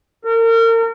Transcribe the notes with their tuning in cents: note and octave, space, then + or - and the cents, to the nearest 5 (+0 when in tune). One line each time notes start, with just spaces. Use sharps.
A#4 -35